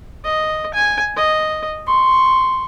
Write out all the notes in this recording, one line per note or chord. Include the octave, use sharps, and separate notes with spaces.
D#5
G#5
D#5
C6 C#6